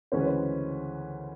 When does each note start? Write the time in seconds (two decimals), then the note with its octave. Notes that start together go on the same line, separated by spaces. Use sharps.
0.12 D2 C#3 E3 G#3 C#4 C5
0.19 B4
0.26 C5